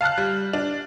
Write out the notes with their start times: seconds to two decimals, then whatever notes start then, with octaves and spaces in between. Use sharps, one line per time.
0.01 F5 A5 F6 F#6
0.18 G3
0.53 D4